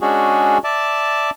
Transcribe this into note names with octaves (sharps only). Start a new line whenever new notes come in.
G#3 C#4 D4 F#4 G#4
D5 E5 A5